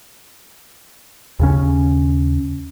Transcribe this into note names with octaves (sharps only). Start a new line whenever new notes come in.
D#2 C#3 C#4